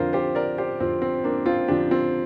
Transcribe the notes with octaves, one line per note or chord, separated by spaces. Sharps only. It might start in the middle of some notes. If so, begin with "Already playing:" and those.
Already playing: F2 D3 F3 D4 F4 A#4 C5
G4 C5
A#4 D5
G4 C5
F2 D3 F3 C4
C4
A#3 D4
C4 F4
F2 D3 F3 D4 G4
C4 F4